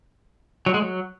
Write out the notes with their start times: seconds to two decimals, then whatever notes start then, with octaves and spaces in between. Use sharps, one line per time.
0.66 F#3
0.74 G#3
0.82 F#3